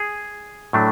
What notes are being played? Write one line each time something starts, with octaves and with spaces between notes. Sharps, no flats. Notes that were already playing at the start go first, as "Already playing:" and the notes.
Already playing: G#4
A2 F#3 A3 D4